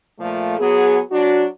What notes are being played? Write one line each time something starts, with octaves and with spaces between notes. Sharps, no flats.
A#2 F3 A3
F#3 B3 G#4
F#3 D4 F#4